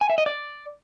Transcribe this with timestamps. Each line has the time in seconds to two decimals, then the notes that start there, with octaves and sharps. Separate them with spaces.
0.01 G#5
0.10 E5
0.18 D#5
0.26 D5